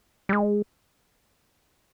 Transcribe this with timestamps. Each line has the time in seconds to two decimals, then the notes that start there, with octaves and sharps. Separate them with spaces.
0.29 G3
0.33 G#3